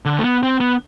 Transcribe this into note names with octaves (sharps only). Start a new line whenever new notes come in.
D3
A3
B3
C4
B3